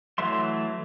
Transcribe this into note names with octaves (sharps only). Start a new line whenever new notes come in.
E3 F#3 A3 E5 C6